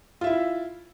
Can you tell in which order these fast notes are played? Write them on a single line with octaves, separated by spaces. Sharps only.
F4 E5 E4